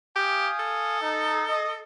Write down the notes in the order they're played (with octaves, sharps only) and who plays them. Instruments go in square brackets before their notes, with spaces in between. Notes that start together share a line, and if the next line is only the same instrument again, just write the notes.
[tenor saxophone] G4 [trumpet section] F5 G#5 D#6
[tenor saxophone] A4
[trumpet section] D#4
D#5